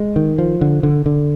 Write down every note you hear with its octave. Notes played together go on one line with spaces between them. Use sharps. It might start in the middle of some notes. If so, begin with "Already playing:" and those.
Already playing: G#3
D#3
F3
D3
D3
D3